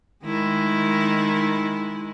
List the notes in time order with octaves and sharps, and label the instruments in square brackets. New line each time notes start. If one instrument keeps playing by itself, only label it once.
[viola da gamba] D#3 G#3 E4